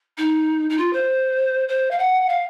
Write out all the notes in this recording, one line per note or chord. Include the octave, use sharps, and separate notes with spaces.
D#4
D#4
F4
C5
C5
F5
F#5
F5